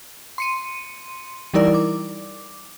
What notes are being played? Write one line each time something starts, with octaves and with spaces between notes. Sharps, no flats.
C6 C#7 D#7
E3 G3 D#4 E4 A#4 D5
D6